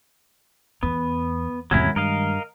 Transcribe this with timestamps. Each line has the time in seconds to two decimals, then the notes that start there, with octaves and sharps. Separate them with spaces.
0.83 E2 B3
1.71 E2 A2 C3 D#3 F#3 G#3 C#4 E4
1.96 G2 A#4 D#5 F5